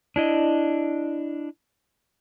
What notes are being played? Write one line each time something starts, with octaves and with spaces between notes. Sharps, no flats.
D4 E4 D#5